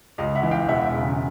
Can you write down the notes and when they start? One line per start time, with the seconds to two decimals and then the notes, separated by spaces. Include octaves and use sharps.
0.18 C#2 D#5 F5
0.35 E5 F#5
0.43 E3
0.51 F5 G5
0.68 E1 E5 F#5
0.94 C#3